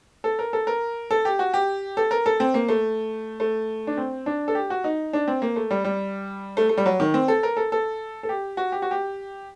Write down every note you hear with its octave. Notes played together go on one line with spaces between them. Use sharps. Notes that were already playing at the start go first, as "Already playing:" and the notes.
A4
A#4
A4
A#4
A4
G4
F#4
G4
A4
A#4
A4
C4
A#3
A3
A3
D4
C4
D4
A4
G4
F#4
D#4
D4
C4
A#3
A3
G3
G3
A3
A3
G3
F#3
D#3
C4
A4
A#4
A4
A4
A4
G4
F#4
G4
F#4
G4